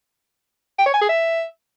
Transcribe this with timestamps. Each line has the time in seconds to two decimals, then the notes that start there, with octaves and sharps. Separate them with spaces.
0.79 G5
0.86 C#5
0.94 G#5
1.01 G#4
1.09 E5